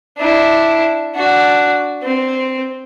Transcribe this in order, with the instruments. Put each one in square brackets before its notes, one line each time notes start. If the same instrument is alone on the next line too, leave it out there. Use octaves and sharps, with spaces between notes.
[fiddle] D4 E4
D4 F#4
C4